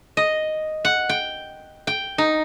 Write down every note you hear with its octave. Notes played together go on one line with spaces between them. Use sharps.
D#5
F#5
G5
G5
D#4